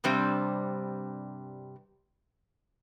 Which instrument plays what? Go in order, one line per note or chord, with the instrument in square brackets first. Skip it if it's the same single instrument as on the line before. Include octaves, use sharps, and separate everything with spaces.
[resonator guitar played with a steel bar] G2 C3 G3 C4 D4